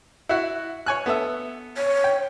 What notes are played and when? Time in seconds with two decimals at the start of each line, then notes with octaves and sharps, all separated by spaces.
0.29 E4 F#4
0.86 C#5 G#5 F#6
1.06 B3 A4 E5
1.77 C#5
2.04 G5